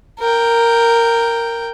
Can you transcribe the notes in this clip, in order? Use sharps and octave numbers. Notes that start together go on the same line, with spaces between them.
A#4 G5